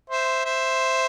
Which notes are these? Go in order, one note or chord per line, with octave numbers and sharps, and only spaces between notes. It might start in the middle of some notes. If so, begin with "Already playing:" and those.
C5 E5
C5 E5